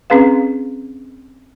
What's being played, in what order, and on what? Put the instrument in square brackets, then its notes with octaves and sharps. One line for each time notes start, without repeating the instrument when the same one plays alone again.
[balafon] C4 C#4 G#4 B4 F5